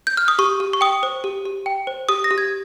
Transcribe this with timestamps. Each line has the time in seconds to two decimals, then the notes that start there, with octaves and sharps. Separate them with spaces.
0.07 G6
0.17 F6
0.28 D#6
0.39 G4 C#6
0.60 G4
0.73 C#6
0.81 G5 D#6
1.03 C5
1.24 G4
1.45 G4
1.66 G5
1.87 C5
2.09 G4 D#6
2.24 A#6
2.31 G4
2.38 G#6